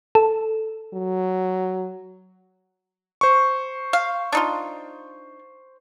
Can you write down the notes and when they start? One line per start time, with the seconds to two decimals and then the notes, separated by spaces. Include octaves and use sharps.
0.15 A4
0.93 F#3
3.21 C5 C#6
3.93 F5
4.32 D4 D#4 F4